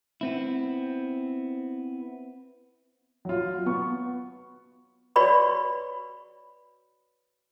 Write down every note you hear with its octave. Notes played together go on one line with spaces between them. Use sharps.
B3 C4 E4
F#3 F4
B3 C#6
F#4 B4 C#5 D5 B5 C#6